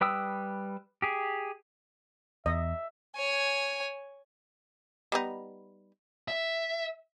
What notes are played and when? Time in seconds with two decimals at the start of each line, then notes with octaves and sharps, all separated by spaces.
0.01 G3 B4 G5 D#6 E6
1.02 G4 G#4
2.46 E2 D#5 E5
3.16 C#5 G#5
5.12 G3 B3 D#4
6.28 E5